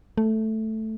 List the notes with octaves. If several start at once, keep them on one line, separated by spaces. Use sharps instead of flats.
A3